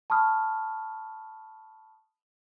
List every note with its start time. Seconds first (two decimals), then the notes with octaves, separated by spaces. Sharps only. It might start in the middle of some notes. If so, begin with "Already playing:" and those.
0.10 A5 B5 C#6 D#6 F6